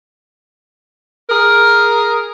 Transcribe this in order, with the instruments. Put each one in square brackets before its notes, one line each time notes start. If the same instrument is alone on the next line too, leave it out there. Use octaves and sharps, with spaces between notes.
[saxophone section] G#4 A#4